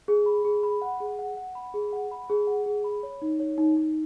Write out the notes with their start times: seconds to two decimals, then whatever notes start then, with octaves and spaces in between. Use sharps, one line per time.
0.08 G#4
0.26 B5
0.45 G#4
0.63 B5
0.82 F#5
1.00 G#4
1.19 F#5
1.37 F#5
1.55 B5
1.74 G#4
1.93 F#5
2.11 B5
2.30 G#4
2.47 F#5
2.66 G#4
2.84 B5
3.03 C#5
3.22 D#4
3.40 C#5
3.58 D#4
3.77 D#4